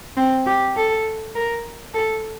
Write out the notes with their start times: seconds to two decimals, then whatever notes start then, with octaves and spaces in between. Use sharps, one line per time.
0.17 C4
0.46 G4
0.77 A4
1.35 A#4
1.94 A4